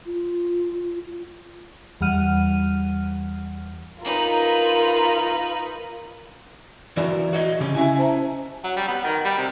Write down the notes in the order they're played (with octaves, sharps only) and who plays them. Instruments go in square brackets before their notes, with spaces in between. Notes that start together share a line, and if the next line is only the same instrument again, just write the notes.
[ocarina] F4
[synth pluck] E2 E3 G3 F#5 F6 D#7
[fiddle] D#4 B4 [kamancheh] F4 A#4
[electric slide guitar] E3 F#4 A#4 [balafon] D5
[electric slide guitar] F#4 C#5 D#5
C#3 C#4 G4
[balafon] C#4 E4 [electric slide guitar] E5 G#5
[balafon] C5 A5 A#5
[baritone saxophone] F#3
G3
B3
D#3
G3
C3